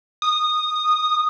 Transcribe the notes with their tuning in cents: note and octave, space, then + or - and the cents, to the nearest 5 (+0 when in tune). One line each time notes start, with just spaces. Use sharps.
D#6 -15